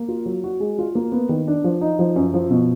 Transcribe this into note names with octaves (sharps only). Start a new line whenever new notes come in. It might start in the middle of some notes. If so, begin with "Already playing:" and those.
Already playing: A#3
F4
F#3
F#4
G#3
F4
A#3
B3
D#3
D4
F3
D#4
F3
F#2
F3
B2